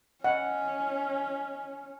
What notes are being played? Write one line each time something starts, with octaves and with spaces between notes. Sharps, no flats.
C#4 D#5 F#5